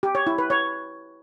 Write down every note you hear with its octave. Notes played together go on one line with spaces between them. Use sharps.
G4
C#5
E4
B4
C#5